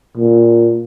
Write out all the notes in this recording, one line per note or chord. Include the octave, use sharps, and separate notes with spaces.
A#2